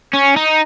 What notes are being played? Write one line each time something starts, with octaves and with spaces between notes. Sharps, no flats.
C#4
D#4